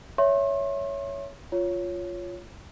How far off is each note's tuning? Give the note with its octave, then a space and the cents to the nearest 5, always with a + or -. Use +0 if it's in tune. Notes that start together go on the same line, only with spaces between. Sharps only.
C#5 +10 E5 +0 C6 +45
F4 +0 C#5 +5